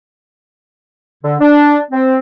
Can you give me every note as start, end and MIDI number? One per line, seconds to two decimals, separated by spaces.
1.24 1.34 50
1.40 1.78 62
1.92 2.17 60